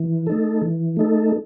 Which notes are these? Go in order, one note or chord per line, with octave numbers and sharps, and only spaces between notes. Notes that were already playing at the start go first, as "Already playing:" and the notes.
Already playing: E3
A3 D#4 A4
E3
A3 D#4 A4